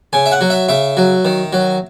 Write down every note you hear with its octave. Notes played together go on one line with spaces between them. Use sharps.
C#3 G#5
E5
F#5
F#3
E5
C#3 E5
F#3
D#3
F#3